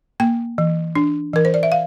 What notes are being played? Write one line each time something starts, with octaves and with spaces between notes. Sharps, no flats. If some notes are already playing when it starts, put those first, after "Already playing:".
A#3 G5
E3
D4
E3 A#4
C5
D5
E5
F5